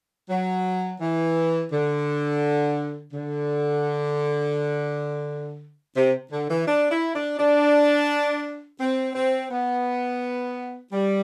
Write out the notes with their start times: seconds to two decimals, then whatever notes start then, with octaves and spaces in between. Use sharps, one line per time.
0.30 F#3
1.01 E3
1.72 D3
3.13 D3
5.97 C3
6.32 D3
6.49 E3
6.67 D4
6.91 E4
7.15 D4
7.38 D4
8.80 C4
9.15 C4
9.51 B3
10.93 G3